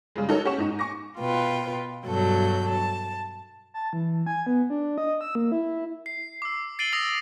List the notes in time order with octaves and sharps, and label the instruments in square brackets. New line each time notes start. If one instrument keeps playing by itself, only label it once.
[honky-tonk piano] C#3 G3 G#3
D#4 F#4 A4 A#4 C#5
C#4 G4 F#5 C#6 E7
G#2 D#4
G#5 C#6 D6 A#6
[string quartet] B2 F4 B4 G5
G2 B2 F#3 A4 G6
A5
[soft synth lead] A5
E3
G#5
B3
D4
D#5
E6
A#3
E4
[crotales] C7
D6 E6
A6 C7 D7 D#7 F#7 G7
D#6 E6 A#6 F7